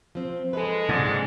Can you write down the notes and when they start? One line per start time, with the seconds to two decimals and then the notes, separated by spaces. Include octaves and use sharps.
0.15 F3 C4
0.53 G#3 A4 B4
0.89 G#2 C3 F3 D4